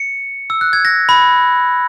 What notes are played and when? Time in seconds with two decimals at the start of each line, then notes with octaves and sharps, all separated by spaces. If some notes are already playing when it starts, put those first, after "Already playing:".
Already playing: C#7
0.50 E6
0.61 F#6
0.73 G#6
0.85 A#6
1.09 B5